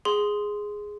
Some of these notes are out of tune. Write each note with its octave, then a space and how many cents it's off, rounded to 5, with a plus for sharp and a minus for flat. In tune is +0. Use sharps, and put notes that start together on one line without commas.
G#4 +0 C6 -10